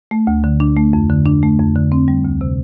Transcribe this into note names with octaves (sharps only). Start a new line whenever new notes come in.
A3
D2
D3
D4
A3
F2
D3
D4
A3
F2
D3
C4
G3
D2
C3